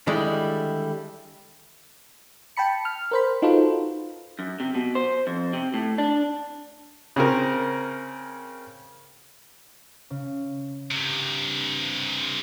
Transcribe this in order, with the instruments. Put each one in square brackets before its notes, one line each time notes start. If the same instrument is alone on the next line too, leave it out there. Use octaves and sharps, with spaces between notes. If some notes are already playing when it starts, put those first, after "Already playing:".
[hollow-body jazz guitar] D3 D#3 G3 G#3 E4
[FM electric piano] G5 A5 B5 C#7
F6
A#4 C5 B5
D#4 F4 F#4 A4 B4 C5
[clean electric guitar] F#2
C3
B2
C5
F2
C3
A2
D4
[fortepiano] C#3 C4 A#4
[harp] C#3
[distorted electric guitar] G2 C3